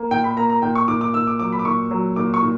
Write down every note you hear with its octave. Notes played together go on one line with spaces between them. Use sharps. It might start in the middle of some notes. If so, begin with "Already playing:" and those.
Already playing: A#3
A#2 G5
B5
A#3 A#5
A#5
A#2 G5
C#6
A#2 D6
D6
A#2 E6
D6
F#3 D6
B5
D6
A#2 C#6
F#3
A#2 D6
C#6
A#2